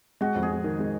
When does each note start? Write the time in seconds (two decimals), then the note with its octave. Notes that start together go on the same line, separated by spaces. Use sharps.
0.21 G#3 F#4
0.35 F2
0.43 G#4
0.49 F2
0.64 D#3
0.79 G#3